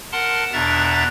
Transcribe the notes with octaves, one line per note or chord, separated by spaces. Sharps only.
A#4 F#5 A5 C6
E2 B2 D4 E5 A#5 A6